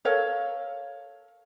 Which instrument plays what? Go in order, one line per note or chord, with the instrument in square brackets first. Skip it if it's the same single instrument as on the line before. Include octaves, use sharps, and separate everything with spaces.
[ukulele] A4 A#4 C#5 F5